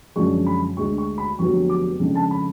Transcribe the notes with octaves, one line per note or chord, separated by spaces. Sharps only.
F#2 D3 F3 G#3 D4 C#6
B5
D2 D3 G#3 C#6
C#6
B5
F1 F2 D3 F#3 B3 C#6
D6
F2 C#3 G#3 D4
A5
B5